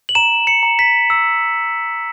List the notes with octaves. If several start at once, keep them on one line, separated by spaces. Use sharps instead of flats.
F#7
A#5 E7
C#7
A#5
B6
E6